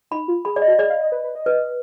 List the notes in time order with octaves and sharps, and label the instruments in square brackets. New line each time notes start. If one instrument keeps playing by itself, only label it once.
[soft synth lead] D#4 [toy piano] B5
[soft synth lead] F4
[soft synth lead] G#4 [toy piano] B5
[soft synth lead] G#4 [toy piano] D5
[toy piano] D#5
[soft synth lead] F#4
[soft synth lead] G#4 [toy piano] D5
[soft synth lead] F5
D#5
B4
B4
D#5
[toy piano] B4